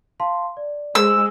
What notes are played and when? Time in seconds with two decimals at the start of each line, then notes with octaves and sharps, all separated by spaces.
0.20 F5 A5 C6
0.57 D5
0.95 G#3 C5 E6